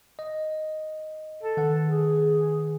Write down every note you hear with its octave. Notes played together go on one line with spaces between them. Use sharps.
D#5
A4
D#3 B4 F#5
G#4